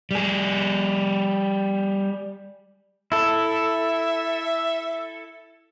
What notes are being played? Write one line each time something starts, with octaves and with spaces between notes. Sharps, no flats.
G3 G#4
E4 A4 E5